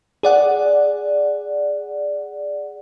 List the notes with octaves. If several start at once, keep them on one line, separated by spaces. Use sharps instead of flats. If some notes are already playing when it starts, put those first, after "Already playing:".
G#4 D5 F#5